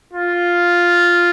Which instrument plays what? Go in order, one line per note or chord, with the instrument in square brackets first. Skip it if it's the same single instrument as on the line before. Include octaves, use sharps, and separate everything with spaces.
[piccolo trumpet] F4